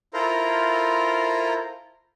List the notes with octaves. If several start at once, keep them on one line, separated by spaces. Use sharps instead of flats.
E4 F4 A4 A#4 C5 A#5